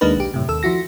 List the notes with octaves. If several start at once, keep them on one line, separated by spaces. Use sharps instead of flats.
D#2 G#3 A#3 D4 D#4 B4
B1 G4
F#2 A2 C3
D#2 A4 E6
F3 E4 F#4 A#6